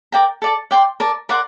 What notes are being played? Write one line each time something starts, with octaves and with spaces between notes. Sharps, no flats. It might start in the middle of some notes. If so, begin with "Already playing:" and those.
A#4 D5 G5 A#5
A4 D5 A5
D5 G5 C6
A#4 D5 A5
A#4 D5 F#5 C6